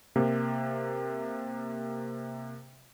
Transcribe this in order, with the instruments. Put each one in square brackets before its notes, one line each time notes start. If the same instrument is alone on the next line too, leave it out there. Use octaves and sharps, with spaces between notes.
[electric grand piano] C3 A#3